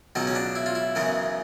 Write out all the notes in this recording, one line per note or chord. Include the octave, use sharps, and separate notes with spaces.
C#2 B2 F#3 B3 D#4
C#4
D4
E4
F4
E4
F#2 C#3 E3 G#3 B3 D#4